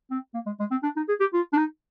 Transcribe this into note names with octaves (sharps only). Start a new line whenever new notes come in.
C4
A#3
G#3
G#3
C4
D4
D#4
G#4
G4
F4
D4
D#4